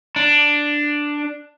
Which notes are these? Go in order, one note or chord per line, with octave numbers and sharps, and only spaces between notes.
D4